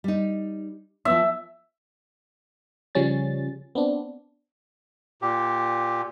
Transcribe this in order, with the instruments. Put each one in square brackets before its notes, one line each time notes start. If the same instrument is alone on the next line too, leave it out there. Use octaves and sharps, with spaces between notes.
[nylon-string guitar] G3 D#4
[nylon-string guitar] F3 B3 [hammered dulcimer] E5
[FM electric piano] C#3 F3 G3 C#4 A6
B3 C4 D4
[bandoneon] A#2 G4